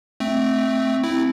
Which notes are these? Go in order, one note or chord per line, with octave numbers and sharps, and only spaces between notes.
A3 C4
C4 E4